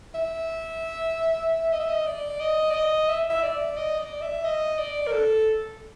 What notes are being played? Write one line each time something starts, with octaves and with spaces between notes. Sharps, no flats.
E5
D#5
E5
D#5
D5
D#5
D5
D#5
E5
E5
D5
D#5
D5
E5
D#5
D5
A#4
A4